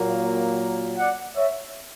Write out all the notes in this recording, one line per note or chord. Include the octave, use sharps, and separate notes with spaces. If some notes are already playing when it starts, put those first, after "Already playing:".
Already playing: A#2 F#3 A#3
D5 F#5
C#5 E5